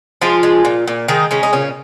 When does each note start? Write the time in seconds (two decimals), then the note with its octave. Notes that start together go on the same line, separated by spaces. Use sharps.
0.21 F3 G#3 F4
0.43 G#3
0.65 A#2
0.88 A#2
1.08 D#3 G#3 D#4
1.31 C#3 G#3 C#4
1.43 D#4
1.53 A#2 C#3 C#4